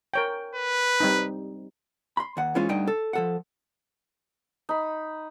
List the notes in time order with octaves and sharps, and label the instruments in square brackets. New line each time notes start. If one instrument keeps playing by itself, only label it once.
[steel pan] A#4 C#5 G5
[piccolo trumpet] B4
[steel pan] G3 C4 D#4
[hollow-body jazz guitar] B5 C6
D#2 F#5
E3 G#3 C#4 F4 C5
D2 G2 D3 D#4 G5
A4
F3 A4 F#5
[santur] D#4 B5